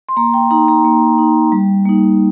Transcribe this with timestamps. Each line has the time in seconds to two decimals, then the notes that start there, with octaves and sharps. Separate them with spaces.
0.09 C6
0.17 A#3 A#5
0.34 G5
0.51 D#4 A#5
0.68 A#5
0.85 A#3
1.18 D#4
1.52 G3
1.85 A#3 D#4